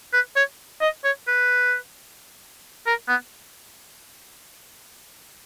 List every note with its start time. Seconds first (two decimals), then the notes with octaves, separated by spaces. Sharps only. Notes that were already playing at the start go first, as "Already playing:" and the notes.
0.13 B4
0.36 C#5
0.81 D#5
1.04 C#5
1.27 B4
2.87 A#4
3.08 B3